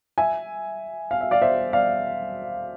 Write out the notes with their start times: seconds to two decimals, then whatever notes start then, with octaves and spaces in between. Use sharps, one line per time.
0.18 E5 G#5
1.11 F5
1.21 E5
1.31 D5 F5
1.42 C5 E5
1.73 D5 F5